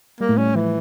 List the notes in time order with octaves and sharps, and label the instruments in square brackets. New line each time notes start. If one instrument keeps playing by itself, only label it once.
[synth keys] G3 [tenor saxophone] A#3
[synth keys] A2 A3
[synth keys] G3 [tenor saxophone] C#4
[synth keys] A2 A3
[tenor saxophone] E3 [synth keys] F3